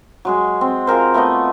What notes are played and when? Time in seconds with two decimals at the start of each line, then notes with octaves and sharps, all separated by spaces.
0.25 F#3 G#3 G#4
0.61 C4
0.87 F4 G#4 A#4 C5
1.14 A3 B3 C#5 D#5